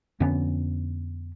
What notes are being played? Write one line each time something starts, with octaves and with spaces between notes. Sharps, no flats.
F2 D3 B3 C#4